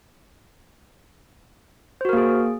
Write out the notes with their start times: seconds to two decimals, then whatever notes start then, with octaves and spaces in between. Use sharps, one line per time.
2.01 C5
2.05 F#4
2.09 A#4
2.13 A#3
2.17 G#4